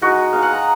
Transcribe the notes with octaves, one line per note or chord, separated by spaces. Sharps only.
G#3 D#4 F#4
G#3 D#4 F5
F#5
A#5